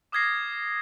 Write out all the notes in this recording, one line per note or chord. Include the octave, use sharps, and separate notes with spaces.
D6 D#6 F6 G#6 A#6 C7